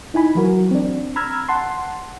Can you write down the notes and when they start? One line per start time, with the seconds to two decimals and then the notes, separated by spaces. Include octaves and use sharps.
0.14 D#4 E4 G#5 B5
0.35 E3 F#3 F#4 A#4
0.71 C4 D4
1.16 A#5 B5 E6 F6 G#6
1.48 F#5 A5 C6